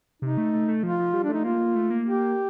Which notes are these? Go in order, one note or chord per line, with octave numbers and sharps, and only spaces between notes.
C3 D#4
A3
A3
A3
F3 F4
F3
G3
D4
A3 D#4
A#3 F4
A#3
A3
A#3
A#3 G4